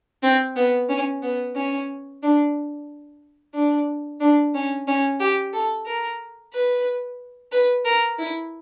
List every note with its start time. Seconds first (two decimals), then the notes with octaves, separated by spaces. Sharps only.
0.23 C4
0.56 B3
0.89 C#4
1.22 B3
1.56 C#4
2.23 D4
3.54 D4
4.20 D4
4.55 C#4
4.88 C#4
5.20 G4
5.53 A4
5.86 A#4
6.53 B4
7.52 B4
7.85 A#4
8.19 E4